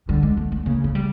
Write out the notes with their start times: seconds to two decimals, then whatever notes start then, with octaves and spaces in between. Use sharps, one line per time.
0.08 D3 G3
0.23 G#3
0.37 A3
0.52 A3
0.66 C#3 A#3
0.84 A3
0.95 G3